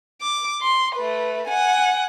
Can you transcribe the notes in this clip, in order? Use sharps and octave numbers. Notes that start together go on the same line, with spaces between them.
D6
C6
A3 B4
F#5 G#5